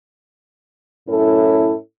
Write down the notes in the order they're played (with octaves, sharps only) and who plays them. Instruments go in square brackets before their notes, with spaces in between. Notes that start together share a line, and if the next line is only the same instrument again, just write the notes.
[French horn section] F#2 A2 C#4 E4 A4